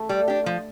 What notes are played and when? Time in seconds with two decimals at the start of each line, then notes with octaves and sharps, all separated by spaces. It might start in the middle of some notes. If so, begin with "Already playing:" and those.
Already playing: A3
0.09 G3
0.28 D4 G4
0.46 F3